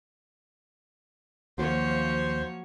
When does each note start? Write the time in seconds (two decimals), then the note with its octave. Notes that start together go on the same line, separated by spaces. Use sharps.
1.58 D#2 F3 F#3 A#3 C5 C#5